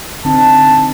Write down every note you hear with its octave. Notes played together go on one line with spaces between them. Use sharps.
D3 C4 D#4 A5